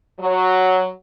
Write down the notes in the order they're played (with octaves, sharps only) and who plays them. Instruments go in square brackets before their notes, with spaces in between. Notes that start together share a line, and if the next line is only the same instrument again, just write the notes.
[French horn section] F#3